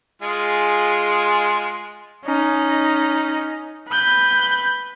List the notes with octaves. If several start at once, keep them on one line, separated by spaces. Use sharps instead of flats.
G#3 F4 G#4
C#4 D#4
B4 G6